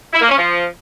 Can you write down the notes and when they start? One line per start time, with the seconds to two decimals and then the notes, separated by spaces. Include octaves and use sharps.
0.13 E4
0.21 A#3
0.29 C#4
0.37 F3